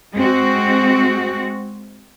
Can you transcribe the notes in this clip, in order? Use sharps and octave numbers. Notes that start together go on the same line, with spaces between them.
G#3 C4 F#4